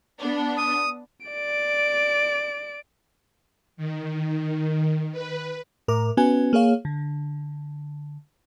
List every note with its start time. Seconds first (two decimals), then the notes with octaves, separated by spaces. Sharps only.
0.19 B3 D4
0.57 D#6
1.26 D5 D7
3.77 D#3
5.12 B4
5.88 A2 A#4 A#5 D6
6.17 B3 C#4 F#4 B4 G#5
6.53 A#3 G#4 C#5 F5
6.85 D3